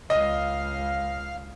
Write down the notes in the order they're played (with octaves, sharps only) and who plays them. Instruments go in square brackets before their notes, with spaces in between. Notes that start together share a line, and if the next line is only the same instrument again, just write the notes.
[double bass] C#2 [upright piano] D#5 [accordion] F5